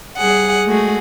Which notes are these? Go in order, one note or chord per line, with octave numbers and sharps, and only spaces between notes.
G3 G#4 F#5
G#3 A3 F#4 G#4